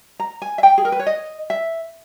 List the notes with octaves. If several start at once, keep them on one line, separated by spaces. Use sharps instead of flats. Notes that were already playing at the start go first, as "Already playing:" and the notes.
A#5
G#5
E5
G5
G#4
A#4
B4
C#5
D#5
E5